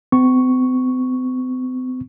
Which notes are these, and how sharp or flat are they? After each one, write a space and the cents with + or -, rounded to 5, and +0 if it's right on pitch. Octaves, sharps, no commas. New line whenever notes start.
C4 -45 C#6 +0